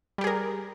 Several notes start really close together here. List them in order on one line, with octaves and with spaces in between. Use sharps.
G3 G4 G#4 A#4